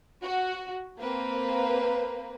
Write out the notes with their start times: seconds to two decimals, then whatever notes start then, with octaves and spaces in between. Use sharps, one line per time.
0.22 F#4
0.98 A#3 C4 B4